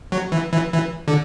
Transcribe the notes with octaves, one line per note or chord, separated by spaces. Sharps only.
F#3
E3
E3
E3
D3